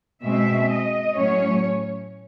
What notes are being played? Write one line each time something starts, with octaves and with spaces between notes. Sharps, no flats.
B2 G#3 C4 E5
D#5
A2 F#3 A3 C#4 C#5